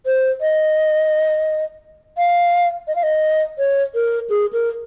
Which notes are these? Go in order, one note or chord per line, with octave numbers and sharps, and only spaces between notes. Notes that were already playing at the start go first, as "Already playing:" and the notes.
C5
D#5
F5
D#5
F5
D#5
C#5
A#4
G#4
A#4